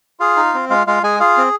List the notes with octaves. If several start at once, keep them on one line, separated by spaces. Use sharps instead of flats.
F4 G#4 F5
D#4
C4
G#3 F4 F5
G#3 F4 F5
G#3 G#4 G#5
F4 G#4 F5
C4